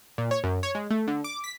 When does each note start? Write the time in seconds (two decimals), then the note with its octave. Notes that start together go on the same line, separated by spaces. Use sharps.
0.18 A#2
0.31 C#5
0.44 F#2
0.63 C#5
0.75 G#3
0.90 A3
1.07 D3
1.24 D6
1.44 B6